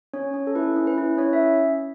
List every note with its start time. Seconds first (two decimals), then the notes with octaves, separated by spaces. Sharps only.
0.14 C#4 C#5
0.34 C#4
0.47 A4
0.55 E4 B4
0.76 C#4
0.87 B4
0.98 E4
1.18 C#4 C#5
1.33 E5